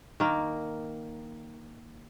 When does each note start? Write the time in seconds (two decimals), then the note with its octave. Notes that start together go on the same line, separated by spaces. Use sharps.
0.20 D#3 A#3